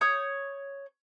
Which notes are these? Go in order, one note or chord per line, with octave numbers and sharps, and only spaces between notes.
C#5 C#6 D#6 G6